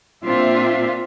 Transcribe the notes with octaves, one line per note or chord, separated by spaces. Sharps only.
A#2 C4 D4 F4 E5